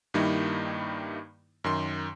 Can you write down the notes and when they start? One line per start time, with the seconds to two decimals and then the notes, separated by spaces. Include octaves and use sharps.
0.14 G2 D#3 G3 A#3 D#4 E4
1.64 F#2 D#3 C6